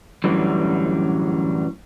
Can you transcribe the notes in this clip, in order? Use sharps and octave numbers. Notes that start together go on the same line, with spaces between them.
F#2 A2 D3 E3 F#3 G3